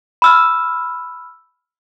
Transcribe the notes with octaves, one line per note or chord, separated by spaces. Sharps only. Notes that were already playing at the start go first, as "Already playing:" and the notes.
B5 E6 F6